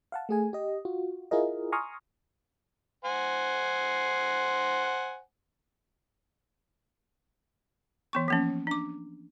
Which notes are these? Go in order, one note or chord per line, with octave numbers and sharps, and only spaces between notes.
F5 F#5 A5
A3 G#4 G#5
G4 D#5
F4 F#4
E4 F4 G#4 A#4 D#5
G#5 A#5 C6 C#6 D#6 F6
C5 F#5 G#5
E3 B3 C#6
F3 A#3 C#4
D4 D6